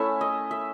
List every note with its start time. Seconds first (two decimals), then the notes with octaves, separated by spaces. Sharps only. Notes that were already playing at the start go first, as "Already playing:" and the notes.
Already playing: A3 C#4 E4 E5
0.21 D#5
0.51 E5